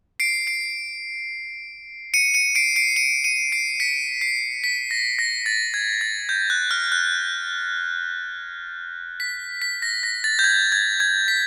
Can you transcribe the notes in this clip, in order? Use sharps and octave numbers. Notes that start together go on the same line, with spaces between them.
C7 D7
C7 D7
C#7 D#7
C#7 D#7
C7 D7
C7 D7
C#7 D#7
C#7 D#7
C7 D7
B6 C#7
C7
B6
A#6
A#6
A6
G#6
A6
G6
F#6
F6
F#6
B6
B6
A#6
A#6
A6
G6
G#6
G#6
G#6
B6